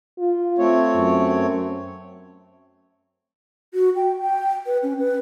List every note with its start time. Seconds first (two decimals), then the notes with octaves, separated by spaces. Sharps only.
0.19 F4
0.58 A3 C4 C#5
0.97 F#2
3.74 F#4
3.96 G5
4.21 G5
4.66 B4
4.83 C#4
4.99 B4